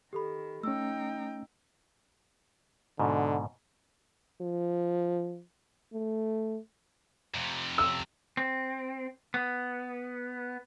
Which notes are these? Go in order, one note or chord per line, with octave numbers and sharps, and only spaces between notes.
D#3 G4 A4 B5
A3 C#4 D#4 G5 E6
G#2 B2 D3
F3
A3
F2 C3
E6
C4
B3